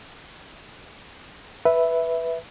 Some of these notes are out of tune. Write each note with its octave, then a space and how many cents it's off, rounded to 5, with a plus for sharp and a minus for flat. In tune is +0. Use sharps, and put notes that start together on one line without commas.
B4 +0 E5 +0